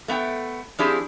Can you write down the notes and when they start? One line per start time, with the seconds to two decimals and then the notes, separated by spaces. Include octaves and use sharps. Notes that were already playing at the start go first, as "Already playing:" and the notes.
0.08 A3 B3 F5 G5
0.79 F3 C4 D4 E4 G4 G#4